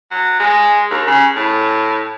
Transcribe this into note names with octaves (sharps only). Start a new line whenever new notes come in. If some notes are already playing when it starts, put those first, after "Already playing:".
F#3
G#3
D#2
C#3
A2